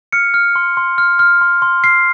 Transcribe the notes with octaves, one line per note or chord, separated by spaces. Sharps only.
F6 C#7
F6
C6
C6
F6
F6
C6
C6
F6 C7